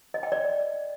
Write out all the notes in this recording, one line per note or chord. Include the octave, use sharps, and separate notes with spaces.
D#5
G5
D5